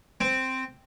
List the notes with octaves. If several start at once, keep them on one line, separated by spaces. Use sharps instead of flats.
C4